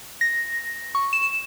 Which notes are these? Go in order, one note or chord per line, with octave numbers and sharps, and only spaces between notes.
A#6
C#6
E7